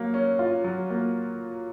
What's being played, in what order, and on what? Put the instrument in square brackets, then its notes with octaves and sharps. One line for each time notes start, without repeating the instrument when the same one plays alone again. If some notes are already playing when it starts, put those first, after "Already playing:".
Already playing: [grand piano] F#3 A#3
C#4
F4
F#3
A#3